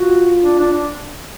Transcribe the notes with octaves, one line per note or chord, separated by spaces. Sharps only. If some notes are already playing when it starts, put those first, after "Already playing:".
Already playing: F4 F#4
D4
D4
D4